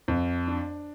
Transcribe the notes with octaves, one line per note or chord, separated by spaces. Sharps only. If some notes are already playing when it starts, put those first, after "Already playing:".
F2
D4